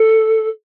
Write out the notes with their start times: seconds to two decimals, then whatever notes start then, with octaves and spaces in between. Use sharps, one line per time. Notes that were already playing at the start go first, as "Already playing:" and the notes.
Already playing: A4